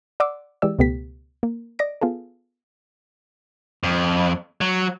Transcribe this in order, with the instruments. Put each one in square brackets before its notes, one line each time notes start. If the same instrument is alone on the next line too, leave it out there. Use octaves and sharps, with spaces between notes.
[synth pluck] D5 F#5 C6 D6 E6
E3 G#3 G4 D5 E6
C#2 B2 A3 B3 G4 B6
A#3
D5 D#5 A#6 D7
B3 F4 G#4 A4
[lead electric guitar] F2
F#3